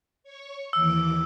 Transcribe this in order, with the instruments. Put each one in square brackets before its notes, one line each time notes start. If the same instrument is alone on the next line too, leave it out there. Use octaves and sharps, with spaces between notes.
[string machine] C#5 C#6
[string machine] D#2 E3 D6 [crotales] E6